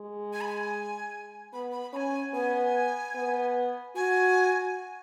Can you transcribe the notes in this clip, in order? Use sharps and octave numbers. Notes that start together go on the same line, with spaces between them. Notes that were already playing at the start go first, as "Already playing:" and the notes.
Already playing: G#3
G#5
B5
G#5
B3 B5
B5
C#4 G#5 B5
B3 G#5
B3
F#4 G#5